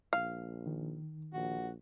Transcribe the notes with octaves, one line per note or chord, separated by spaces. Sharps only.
A#1 F5
D#3
A#1 F#4